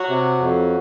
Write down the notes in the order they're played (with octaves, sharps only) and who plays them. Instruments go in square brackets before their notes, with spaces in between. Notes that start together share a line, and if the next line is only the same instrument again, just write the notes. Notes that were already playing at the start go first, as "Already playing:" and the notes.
Already playing: [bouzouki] F#3 F#4
[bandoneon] C3
F2